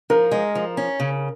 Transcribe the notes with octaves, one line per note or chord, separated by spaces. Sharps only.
F3 A#4
G#3
F3
C#4
C#3